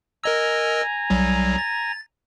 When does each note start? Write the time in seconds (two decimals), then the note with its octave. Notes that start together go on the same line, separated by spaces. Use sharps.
0.24 A#4 D#5 G#5 A#5 E6
1.10 B1 F#3 G3
1.58 A6